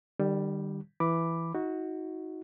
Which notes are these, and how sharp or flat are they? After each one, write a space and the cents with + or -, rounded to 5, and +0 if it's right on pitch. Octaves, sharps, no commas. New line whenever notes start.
D#3 -45 G3 +0
E3 +5 B5 +0 D6 +0
D#4 +35 F#4 -5